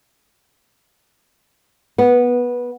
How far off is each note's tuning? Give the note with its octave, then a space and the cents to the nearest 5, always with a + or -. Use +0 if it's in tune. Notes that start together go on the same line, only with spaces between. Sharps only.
B3 -15